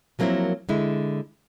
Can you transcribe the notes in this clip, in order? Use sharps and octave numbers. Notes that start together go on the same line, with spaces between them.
F3 F#3 A#3 C4 E4 A#4
D3 G#3 E4